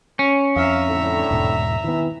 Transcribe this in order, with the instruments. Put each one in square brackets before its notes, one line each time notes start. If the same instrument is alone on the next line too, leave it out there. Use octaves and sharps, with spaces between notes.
[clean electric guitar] C#4
[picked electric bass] F2 [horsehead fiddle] E5 A#5 [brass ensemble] F5
[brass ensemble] A2 D3
[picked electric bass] E1 G#2 B2
[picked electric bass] D#3 B3 [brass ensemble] E3 E4